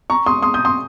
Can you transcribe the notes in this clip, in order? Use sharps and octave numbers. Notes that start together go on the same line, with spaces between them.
A#5 C#6
C6 D#6
C6 D#6
D#6 G6
C6 D#6